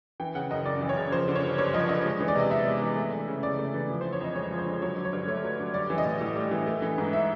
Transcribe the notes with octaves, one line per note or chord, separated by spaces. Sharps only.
E3 G5
C#3 F#5
F#2 D#5
F#2 D5
E3
C#5
C#3
F3 C5
D3
C#5
G2
G2 C#5
F3 D#5
D3 D#5
G#3
E3
D5
C3 D#5
B3 E5
G#3
E3
A3
E3
C#3
C#3 D5
A3
E3
F3
D3 C5
C#5
F2 D#5
G#3 C#5
F3
C5
D3
F#3 C#5
D3
C#5
G2
A3 C#5
F#3
D3
G3 D5
E3
D#5
A2
A2
G3
E3
A3
E3
G#2
E5